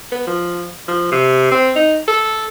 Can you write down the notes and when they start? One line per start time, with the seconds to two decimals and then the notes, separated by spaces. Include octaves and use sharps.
0.12 B3
0.27 F3
0.88 F3
1.12 C3
1.51 C4
1.76 D#4
2.08 A4